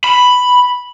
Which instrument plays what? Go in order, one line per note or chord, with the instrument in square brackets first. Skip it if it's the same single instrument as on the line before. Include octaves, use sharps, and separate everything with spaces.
[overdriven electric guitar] B5